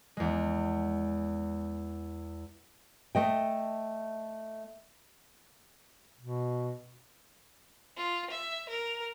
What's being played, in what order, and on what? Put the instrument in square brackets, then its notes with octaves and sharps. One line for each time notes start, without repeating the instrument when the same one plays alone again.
[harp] E2 G#3
[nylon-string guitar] A3 D#5 G5
[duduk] B2
[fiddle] F4
E5
A#4